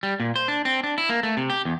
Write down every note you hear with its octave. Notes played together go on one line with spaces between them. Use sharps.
G3
A#2
C5
D4
C4
D4
E4
A#3
A3
C3
G4
E2